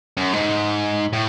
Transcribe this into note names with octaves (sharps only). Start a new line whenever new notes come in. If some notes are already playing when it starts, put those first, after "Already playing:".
F#2
G#2
A2